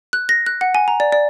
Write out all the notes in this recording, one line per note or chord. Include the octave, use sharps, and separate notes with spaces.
F#6
A#6
F#6
F#5
G#5
A#5
D5
D5